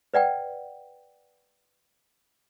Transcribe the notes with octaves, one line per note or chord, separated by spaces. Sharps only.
B4 D5 F#5 G5